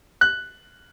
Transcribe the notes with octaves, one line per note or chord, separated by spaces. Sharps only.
F#6